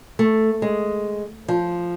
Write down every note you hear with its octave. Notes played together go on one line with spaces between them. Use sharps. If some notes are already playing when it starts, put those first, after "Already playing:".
A3
G#3
F3